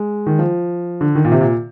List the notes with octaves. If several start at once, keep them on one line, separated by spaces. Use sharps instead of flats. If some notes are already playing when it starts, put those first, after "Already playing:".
Already playing: G#3
D#3
F3
D3
D#3
A#2
C3
A#2